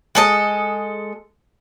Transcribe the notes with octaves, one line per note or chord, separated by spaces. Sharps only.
G#3 A4 D#5